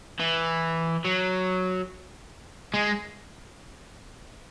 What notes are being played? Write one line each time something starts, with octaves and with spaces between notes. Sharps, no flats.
E3
F#3
G#3